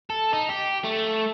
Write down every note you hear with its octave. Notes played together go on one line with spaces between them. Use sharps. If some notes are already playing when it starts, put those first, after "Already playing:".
A4
D#4
G4
A3